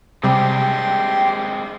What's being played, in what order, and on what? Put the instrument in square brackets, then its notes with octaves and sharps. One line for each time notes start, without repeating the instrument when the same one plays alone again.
[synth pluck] C3 G3 [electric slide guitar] G#3 C4 D4 [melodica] G4 G5 C6